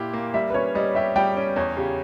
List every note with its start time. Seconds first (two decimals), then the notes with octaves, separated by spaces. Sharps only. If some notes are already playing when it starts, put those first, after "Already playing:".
Already playing: A#2 A#3 E4 G4
0.13 A#3
0.34 G3 E5
0.50 B4
0.54 C#4 C#5
0.75 G3 D#5
0.95 G4 E5
1.16 G3 G5
1.37 C#4
1.56 E2 C#5
1.77 C#3 G4